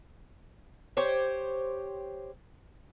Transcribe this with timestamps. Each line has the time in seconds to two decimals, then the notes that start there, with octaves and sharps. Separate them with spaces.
0.97 G4 C5 C#5